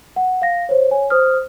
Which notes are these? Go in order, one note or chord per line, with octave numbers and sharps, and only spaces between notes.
F#5
F5 A#6
C5 C#5
C#5 G#5
C5 D#6 F6